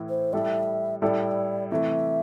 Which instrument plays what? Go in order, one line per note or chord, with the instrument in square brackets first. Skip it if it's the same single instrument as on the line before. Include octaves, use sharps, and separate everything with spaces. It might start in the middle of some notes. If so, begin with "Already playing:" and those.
Already playing: [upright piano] A2 E3 A3 E4
[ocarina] C5
[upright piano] A2 G3 E4 A4 [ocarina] E5
[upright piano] A2 G3 E4 A4 [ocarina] D5
[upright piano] C3 E3 A3 [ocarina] E5